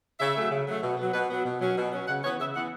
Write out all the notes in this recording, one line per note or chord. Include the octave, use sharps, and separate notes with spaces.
C#3 E5
F#3 A3
C#3
F#3 A3
B2
F#3 B3
B2 B4
F#3 B3
B2
F#3 C#4
B2
F#3 C#4
C#3 F#5
E3 B3 C#5
C#3 E5
E3 B3 F#5